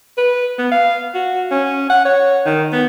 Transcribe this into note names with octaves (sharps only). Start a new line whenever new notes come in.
B4
B3
F5
F#4
C#4
F#5
C#5
D#3
B3